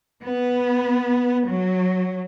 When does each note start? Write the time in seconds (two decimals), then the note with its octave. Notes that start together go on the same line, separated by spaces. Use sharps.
0.23 B3
1.48 F#3